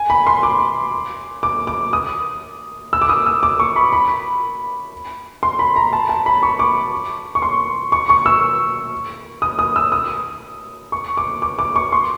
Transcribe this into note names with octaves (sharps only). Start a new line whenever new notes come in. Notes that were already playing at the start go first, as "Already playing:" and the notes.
Already playing: G#5
B5
C6
D6
D6
D6
D#6
E6
D6
D#6
E6
D6
C#6
B5
B5
C6
B5
A#5
A5
A5
B5
C#6
D6
C#6
C6
C#6
C#6
E6
D#6
D#6
E6
D#6
C#6
D6
D6
D6
C#6
C6